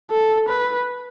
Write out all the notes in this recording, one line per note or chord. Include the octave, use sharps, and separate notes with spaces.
A4
B4